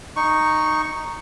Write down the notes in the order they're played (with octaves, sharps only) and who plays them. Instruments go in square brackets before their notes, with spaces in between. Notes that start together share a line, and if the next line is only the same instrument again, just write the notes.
[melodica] D#4 C#6